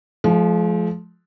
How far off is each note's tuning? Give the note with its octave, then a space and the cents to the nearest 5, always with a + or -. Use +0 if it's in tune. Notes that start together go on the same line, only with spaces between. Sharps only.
F3 +0 G#3 +45